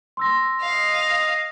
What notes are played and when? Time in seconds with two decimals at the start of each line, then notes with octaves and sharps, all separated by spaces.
0.17 C6 E6 A#6
0.61 D#5 F5